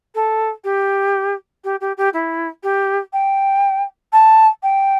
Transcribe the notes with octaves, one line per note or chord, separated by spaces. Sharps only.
A4
G4
G4
G4
G4
E4
G4
G5
A5
G5